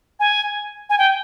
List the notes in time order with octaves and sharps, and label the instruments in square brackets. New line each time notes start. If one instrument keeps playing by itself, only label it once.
[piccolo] G#5
G#5
G5